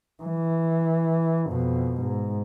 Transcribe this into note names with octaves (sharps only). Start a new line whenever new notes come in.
E3
F2 B2
G#2